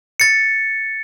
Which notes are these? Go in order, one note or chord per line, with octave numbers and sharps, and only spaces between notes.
A6 C#7